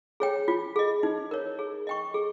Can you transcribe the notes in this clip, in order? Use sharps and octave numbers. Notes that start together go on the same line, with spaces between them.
G#4 C#5 G5
F4
G#4 D#5
D#4
A#4 C#5
G#4
D#5 G5 C#6
G#4